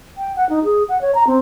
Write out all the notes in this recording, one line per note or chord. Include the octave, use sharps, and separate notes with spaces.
G5
F#5
D#4
G#4
F#5
C#5
A#5
C4